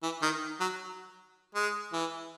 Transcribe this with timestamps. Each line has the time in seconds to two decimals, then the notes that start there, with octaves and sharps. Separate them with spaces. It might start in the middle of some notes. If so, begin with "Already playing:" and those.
0.03 E3
0.22 D#3
0.60 F#3
1.55 G#3
1.93 E3